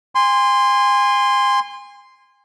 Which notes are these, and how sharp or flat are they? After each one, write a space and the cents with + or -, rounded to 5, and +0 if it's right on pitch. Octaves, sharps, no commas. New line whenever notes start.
G#5 -35 C6 -5